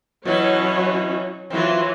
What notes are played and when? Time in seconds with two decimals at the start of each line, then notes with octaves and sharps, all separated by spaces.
0.25 B2 E3 F#3 C#4 C#5
1.50 E3 F#3 C4 F4